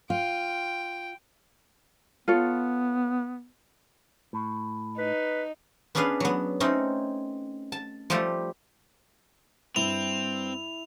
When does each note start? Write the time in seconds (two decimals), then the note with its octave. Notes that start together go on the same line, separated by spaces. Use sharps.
0.10 F4 G5
2.28 B3 F4 A4 C#5
4.33 A2
4.98 D#4 B4
5.95 B3 C#4 D4 G#4 B4 F5
6.20 F#3 B3
6.60 A3 C4 C#4 D#4
7.72 A5
8.10 F3 G3 A3 G4 A4
9.76 G2 C4 E4 F7